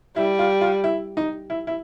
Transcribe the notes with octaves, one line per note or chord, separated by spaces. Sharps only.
G3 E4
F4
F4
E4
D#4
E4
E4